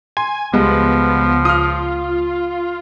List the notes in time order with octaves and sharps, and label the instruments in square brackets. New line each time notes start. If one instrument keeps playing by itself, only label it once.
[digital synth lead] G#5 [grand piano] C6
[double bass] C#2 [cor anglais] F3 [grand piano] G3 G#3 [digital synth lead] B3
[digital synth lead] F4 [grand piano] D#6 F6